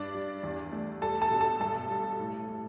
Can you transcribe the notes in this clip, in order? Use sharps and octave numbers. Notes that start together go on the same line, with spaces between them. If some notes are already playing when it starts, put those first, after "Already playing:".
Already playing: G2 D4 D5
G3
E2
A3
G3 A4 A5
A4 A5
B2
A4 A5
G2 A4 A5
G3
A2
G3